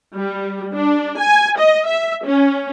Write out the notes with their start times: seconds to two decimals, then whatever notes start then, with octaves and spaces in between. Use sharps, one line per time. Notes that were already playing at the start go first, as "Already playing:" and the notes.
0.16 G3
0.74 D4
1.20 G#5
1.59 D#5
1.88 E5
2.25 C#4